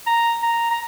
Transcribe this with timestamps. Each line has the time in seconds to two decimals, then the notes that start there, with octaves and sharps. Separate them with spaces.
0.07 A#5
0.43 A#5
0.71 A#5